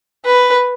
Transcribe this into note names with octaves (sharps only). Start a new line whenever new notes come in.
B4